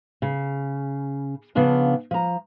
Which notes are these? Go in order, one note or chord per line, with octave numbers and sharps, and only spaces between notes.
C#3
C#3 F3 B3 D4 F4
F3 A#5